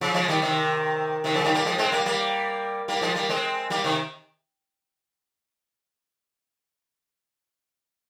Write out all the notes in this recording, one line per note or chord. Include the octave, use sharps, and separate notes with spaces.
C#3 F3
F3 G#3
D#3 G3
C3 D#3
C3 D#3
C#3 F3
D#3 G3
G3 A#3
F3 G#3
G#3 C4
G3 A#3
G3 A#3
G3 A#3
F3 G#3
G3 A#3
G#3 C4
G3 A#3
C3 D#3